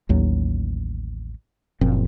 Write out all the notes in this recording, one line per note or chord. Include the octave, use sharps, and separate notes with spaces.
A1 D#2 F#3
F#1 A#2 F3 C4